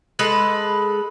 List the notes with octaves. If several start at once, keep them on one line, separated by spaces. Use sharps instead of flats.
G#3 A4 B4